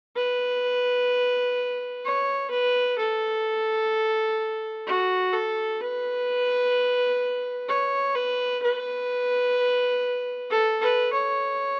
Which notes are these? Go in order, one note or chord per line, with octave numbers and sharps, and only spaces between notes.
B4
C#5
B4
A4
F#4
A4
B4
C#5
B4
B4
A4
B4
C#5